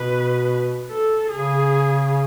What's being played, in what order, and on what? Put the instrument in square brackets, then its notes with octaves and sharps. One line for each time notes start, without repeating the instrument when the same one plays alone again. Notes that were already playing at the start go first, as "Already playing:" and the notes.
Already playing: [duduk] B2 [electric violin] B4
[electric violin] A4
[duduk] C#3 [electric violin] G#4